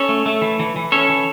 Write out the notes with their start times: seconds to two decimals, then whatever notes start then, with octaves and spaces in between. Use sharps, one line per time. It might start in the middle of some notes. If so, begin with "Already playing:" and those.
Already playing: C#4 A4 C#5
0.09 A3
0.26 A3
0.42 E3
0.59 E3
0.76 E3
0.92 C#4 A4 C#5
1.09 E3